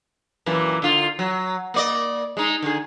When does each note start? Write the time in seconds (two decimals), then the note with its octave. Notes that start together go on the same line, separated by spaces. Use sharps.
0.46 F#2 A#2 E3
0.82 D3 F4
1.19 F#3
1.74 A#3 D5 D#5
2.37 G#3 D#4
2.62 D3 G#4